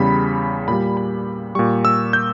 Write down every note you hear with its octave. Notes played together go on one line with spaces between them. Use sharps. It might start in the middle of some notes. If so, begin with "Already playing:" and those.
Already playing: E2 C#3 G3 B5
A#2 G3 B5
B5
A#2 G3 C#6
E6
G6